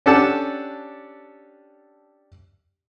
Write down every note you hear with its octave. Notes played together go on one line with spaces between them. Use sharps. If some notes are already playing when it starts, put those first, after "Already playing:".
C#4 D4 G4 A4 F#5 A5